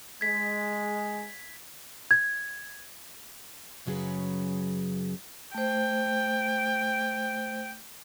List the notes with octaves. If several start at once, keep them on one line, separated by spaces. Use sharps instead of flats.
G#3 G#6 B6
G#6
F#2 C#3 F#3 D#4 G#4 B4
A3 C5 G5